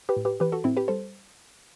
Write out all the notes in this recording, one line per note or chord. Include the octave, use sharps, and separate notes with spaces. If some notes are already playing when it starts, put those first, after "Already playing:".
G4 B4
A2
G4 B4
E3 G4 B4
F#4 A4
A2 C4 E4
G4 B4
G3 A4 C5